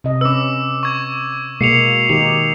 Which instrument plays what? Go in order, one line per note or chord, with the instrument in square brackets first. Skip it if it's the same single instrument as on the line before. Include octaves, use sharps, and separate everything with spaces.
[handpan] C3 D#5
[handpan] C#4 B4 [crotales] D6 E6
[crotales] C#6 G#6
[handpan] B2 G#3 A#3 [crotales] C7 C#7 F7
[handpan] D#3 D#4 G4 [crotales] F7